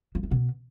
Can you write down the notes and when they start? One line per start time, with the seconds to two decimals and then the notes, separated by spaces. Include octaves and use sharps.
0.15 F3
0.23 E3
0.31 B2